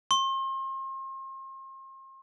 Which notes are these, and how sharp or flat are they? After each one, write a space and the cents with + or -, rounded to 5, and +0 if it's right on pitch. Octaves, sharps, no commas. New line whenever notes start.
C6 +40